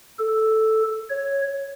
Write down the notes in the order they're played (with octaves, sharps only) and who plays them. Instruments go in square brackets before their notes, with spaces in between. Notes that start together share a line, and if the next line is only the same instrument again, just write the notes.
[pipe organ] A4
C#5